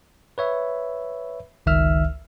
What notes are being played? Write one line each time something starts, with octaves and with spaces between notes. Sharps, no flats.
B4 C#5 E5
G1 C#2 D#3 E5 E6 F6